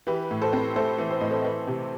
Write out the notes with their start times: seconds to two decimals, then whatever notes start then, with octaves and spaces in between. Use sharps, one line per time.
0.07 E3 G4 B4
0.31 A2
0.41 A4 C5
0.53 C4
0.76 A3 A4 C5
0.98 E3
1.10 C5
1.21 A2 D#5
1.31 A4 C5
1.44 E3
1.67 C3